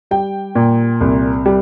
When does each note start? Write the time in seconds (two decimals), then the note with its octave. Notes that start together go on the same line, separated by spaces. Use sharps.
0.11 G3 G5
0.55 A#2
1.01 C2
1.46 G3